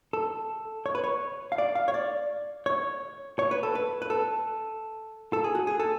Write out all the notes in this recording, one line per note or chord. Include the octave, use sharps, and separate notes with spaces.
A4
C#5
B4
C#5
F5
D5
F5
C#5
D5
C#5
C#5
B4
A4
B4
B4
A4
A4
G#4
F#4
G#4
A4